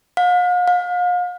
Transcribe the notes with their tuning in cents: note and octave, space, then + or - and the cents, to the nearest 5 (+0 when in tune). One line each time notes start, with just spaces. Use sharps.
F5 +45
F5 +40